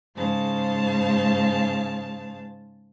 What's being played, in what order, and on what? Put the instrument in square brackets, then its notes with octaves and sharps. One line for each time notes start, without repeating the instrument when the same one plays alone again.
[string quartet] G#2 C#3 C5 F5 A5